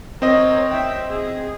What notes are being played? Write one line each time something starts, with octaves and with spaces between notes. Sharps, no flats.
C4 A#4 C#5 D#5
E5 G5
G#4